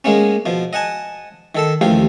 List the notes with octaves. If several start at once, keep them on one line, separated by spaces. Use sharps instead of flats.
G#3 A#3 B3 C#4
B2 F3
D#5 F#5 G#5 A5
D#3 A4 A5
A1 D#2 F3 G4 F5